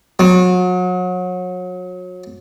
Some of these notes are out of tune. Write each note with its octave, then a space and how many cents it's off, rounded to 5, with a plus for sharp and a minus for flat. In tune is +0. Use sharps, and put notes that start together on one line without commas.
F#3 -30